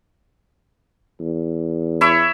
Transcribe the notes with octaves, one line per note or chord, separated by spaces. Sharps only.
E2
E4 C#5 E5